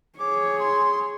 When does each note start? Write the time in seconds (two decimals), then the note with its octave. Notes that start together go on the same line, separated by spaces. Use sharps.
0.19 G#4 C#5 D6
0.60 C6